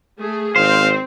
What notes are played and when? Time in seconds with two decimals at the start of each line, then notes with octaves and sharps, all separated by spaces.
0.19 A3 G#4
0.56 G#1 C4 C5 F5